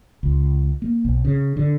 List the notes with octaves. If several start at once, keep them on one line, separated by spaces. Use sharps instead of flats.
C#2
A#3
B1
C#3
D3